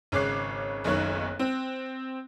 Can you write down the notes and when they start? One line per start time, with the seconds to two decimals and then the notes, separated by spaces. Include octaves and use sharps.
0.12 G#1 C#3 C#5 D6 F#6 C7
0.84 F#1 B1 D#3 C#5 C#6 F#6
1.39 C4